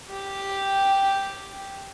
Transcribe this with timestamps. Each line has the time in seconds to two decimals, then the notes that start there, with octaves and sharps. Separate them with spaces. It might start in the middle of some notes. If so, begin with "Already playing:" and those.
0.10 G4 G5